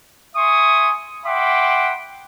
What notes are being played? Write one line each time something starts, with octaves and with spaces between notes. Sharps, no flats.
E5 G#5 C6 C#6 D#6
E5 F#5 G5 B5 C6 D6